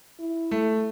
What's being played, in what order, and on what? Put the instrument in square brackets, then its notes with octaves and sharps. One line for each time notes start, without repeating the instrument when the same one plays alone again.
[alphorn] E4
[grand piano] A3